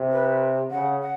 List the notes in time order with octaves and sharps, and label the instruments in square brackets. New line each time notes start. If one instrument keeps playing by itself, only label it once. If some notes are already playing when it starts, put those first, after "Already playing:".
Already playing: [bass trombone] C3
[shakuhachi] B4
[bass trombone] C#3 [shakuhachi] F#5
[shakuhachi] F#5